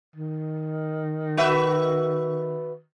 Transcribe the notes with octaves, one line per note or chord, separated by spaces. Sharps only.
D#3
F#4 B4 E5